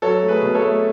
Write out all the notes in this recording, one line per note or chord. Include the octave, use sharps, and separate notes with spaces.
F#3 A4 C#5
A3
G#4 B4
B2
A4 C#5
A3